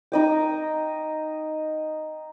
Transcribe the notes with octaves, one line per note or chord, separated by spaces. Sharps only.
D#4 D#5 G5